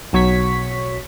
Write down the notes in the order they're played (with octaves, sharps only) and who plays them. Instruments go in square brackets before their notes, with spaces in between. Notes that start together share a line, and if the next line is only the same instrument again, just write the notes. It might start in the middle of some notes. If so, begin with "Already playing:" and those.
[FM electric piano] B1 F#3 C#5 C#6 B6